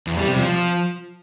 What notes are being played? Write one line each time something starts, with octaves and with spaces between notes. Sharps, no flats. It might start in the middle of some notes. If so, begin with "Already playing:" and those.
E2
G3
C3
F3